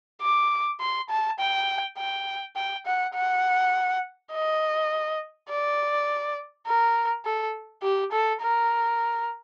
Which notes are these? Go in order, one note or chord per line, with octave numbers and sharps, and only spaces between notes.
D6
C6
A5
G5
G5
G5
F#5
F#5
D#5
D5
A#4
A4
G4
A4
A#4